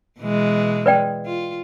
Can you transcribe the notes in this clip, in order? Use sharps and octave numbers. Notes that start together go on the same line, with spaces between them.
B2 E3 G#3
B4 D5 G5
F4